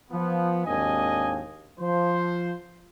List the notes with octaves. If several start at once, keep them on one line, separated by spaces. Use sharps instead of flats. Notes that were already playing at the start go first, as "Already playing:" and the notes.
F3 B3
G#1 D#2 D4 D#5 G#5
F3 C5